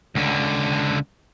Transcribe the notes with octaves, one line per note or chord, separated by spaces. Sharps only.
C#2 D3